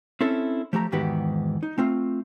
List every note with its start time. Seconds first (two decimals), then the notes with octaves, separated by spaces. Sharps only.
0.21 C4 C#4 E4 A4
0.73 F3 A3 G4 A#5
0.92 E2 G#2 D#3 F#4 G4 B4
1.63 D#4
1.78 A3 C4 F4